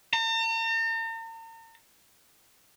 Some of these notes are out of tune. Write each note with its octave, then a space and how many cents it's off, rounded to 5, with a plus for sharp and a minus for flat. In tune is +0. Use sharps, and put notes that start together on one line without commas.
A#5 -45